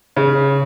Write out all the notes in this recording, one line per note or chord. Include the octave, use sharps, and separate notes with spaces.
C#3